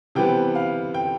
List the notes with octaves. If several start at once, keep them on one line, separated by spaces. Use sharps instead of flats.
C3 E3 G3 B3 G5
F5
G5